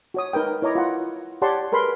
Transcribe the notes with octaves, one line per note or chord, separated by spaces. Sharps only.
F#4 C#5 D#6
D#4 A#4 B4 G5
E4 C#5 D#5 A#5 D6
F4 F#5
G4 C#5 D5 F#5 A5 C6
G#4 A#4 B4 B5 C6